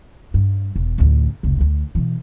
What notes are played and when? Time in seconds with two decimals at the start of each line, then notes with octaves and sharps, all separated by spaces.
0.34 G2
0.76 E1
0.98 A1 D2
1.43 F1 C#2
1.61 D2
1.95 B2 E3